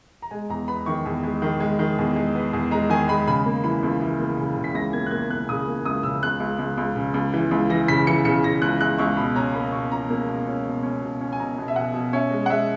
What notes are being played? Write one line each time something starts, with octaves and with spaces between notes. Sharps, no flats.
A#5
G#3 G#5
E2 A#5
B3 B5
D#3 C#6
E2
G#3
D#3
G#3
D#3
E2
G#3
B3
E2
G#3 A#5
D#3 G#5
G#3 B5
C#3 B5
A#3
E3 B5
C#2
E3
A#3
C#3
C#3
B6
C#2 A#6
A#3 G#6
F#6
A#3 G#6
A#3 F#6
C#3 D#6
A#3
C#2 D#6
C#3 E6
C#2 F#6
C#2
C#2
C#2
C#3
C#2
E3
C#2
E3 A#6
C#3 B6
E3 C#7
C#3 C#7
C#3 A#6
C#2 F#6
C#2 F#6
C#2 C#6
B2 B5
C#4 A#5
A#3 B5
B2 C#6
C#4 A#5
A#3
B2
C#4
B2
C#4
B2
C#4
G#5
B2 A#5
B2
E5
B2 F#5
B2
C#4 E5
G#3
F#5
G#3 E5